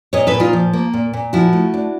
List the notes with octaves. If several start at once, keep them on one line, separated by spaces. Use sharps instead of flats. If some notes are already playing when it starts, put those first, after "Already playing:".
A#2 C#5 D#5
A4 B4
A#2
D#4 F4
F3
A#3
A#2
A#2
F3 E4 F#4
A3
D4